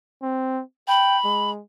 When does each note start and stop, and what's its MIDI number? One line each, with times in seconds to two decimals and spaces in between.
0.22 0.62 60
0.88 1.18 79
0.88 1.51 83
1.24 1.61 56